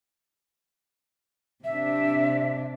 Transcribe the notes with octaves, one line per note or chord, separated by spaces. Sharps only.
C3 D4 E5